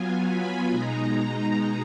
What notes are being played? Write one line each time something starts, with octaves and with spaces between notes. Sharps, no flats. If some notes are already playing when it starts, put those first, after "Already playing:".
Already playing: F#3 B3 F4 G#5
B5
B2 G#3 D#4 A#5